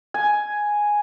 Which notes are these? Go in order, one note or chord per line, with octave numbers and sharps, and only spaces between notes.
G#5